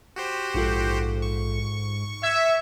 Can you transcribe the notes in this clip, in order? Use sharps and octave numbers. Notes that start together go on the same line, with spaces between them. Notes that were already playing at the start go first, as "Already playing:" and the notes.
F#4 G4 C5
A#1 G#2 F4 A4
C#6
E5 G#6